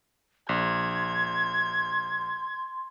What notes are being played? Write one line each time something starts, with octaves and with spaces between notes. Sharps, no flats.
A#1 C6 G#6